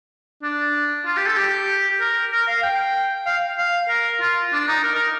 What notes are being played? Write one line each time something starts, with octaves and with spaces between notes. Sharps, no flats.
D4
F4
G4
A4
G4
A#4
A#4
F5
G5
F5
F5
A#4
F4
D4
D#4
A#4
A#4